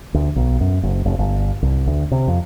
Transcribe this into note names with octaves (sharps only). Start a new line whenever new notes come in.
D2
B1
F#2
F#1
F1
G1
C2
D2
C3
F2